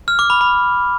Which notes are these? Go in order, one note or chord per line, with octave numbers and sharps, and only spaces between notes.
F6
D6
B5
B5